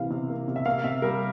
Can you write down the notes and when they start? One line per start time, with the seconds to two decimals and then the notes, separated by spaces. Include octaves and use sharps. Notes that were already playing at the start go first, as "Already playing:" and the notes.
Already playing: C3 E3 A#3 F5
0.11 C3
0.30 A#3
0.48 C3
0.56 E5
0.65 A#3 F5
0.84 C3 E5
1.02 G3 A#4